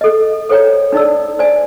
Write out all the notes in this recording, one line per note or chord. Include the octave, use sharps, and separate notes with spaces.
A4 D#5
A4 C5 C#5 G5 A#5
D4 D#4 D5 E6
C5 D5 G#5